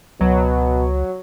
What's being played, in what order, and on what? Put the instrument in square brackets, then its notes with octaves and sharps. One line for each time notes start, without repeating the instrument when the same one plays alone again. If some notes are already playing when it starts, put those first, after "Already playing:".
[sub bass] C#2 [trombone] B2 [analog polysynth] F#3